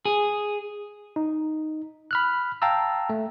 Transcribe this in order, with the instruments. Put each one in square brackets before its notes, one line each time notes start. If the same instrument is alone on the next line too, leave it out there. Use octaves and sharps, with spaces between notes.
[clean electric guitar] G#4
[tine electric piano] D#4
B5 F6 F#6
F5 G5 A5 A#5 E6
A3